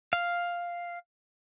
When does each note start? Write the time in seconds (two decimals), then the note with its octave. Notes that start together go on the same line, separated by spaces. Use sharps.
0.13 F5